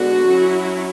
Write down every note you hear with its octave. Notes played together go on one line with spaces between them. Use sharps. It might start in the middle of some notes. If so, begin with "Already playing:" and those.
Already playing: D3 G#3 B3 D4 F#4
F#3 C#4 E4